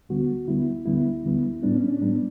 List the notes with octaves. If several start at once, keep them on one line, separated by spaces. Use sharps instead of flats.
D2 D3 G3 B3 F#4
D2 D3 G3 B3 E4
D2 D3 G3 B3 E4
D2 D3 G3 B3
A2 G3 B3 D4
C#4
D4
A2 G3 B3 D4